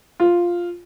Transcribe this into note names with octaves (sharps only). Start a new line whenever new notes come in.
F4